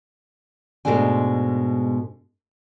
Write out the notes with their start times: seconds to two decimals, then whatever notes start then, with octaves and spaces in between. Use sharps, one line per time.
0.85 G#2 B2 G#3 A3 D4 G#5